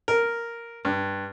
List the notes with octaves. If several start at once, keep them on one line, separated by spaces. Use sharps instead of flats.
A#4
G2